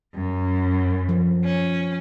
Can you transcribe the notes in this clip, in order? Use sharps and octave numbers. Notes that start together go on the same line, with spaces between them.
F#2
F3
C#4